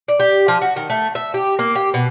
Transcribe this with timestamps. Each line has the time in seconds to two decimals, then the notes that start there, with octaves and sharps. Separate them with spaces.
0.08 D5
0.20 G4
0.48 F3
0.61 F#4
0.76 D#3
0.90 A3
1.15 E5
1.34 G4
1.59 A#3
1.75 G4
1.94 B2